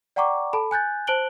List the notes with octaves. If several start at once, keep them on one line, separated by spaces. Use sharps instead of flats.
D5 F#5 G5 A#5 C#6 D6
A4 A5 B5
G#5 F#6 G6 A6
C5 A5 F#6 D7 F#7 G7